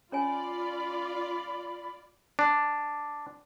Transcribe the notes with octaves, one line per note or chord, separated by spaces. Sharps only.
C#4 F4 C#5 D5 G#5 B5
D4